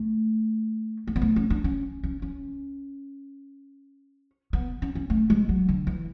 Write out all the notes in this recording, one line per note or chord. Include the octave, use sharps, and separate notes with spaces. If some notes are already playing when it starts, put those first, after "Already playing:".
Already playing: A3
A3
B3
A3
C#4
D4
C#4
C#4
C#4
B3
C#4
C#4
A3
G#3
F#3
D3
E3